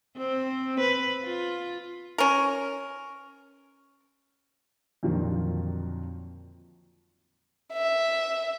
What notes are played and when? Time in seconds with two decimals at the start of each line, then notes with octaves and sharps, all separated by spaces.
0.17 C4
0.80 B4
1.23 F4
2.18 C#4 A#4
5.03 F2 A#2 D3 D#3 F3 F#3
7.73 E5